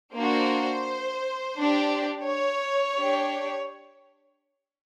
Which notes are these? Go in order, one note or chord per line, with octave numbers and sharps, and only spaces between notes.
A#3 D4 F#4 C5
D4 G4
C#5
D4 G4